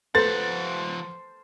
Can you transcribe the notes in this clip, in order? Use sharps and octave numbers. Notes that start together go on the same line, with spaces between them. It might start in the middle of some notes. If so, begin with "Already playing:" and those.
F3 A4 B4 C5 F#5 A6